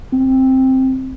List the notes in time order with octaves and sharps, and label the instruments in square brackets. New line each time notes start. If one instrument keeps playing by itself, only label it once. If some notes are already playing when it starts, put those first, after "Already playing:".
[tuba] C4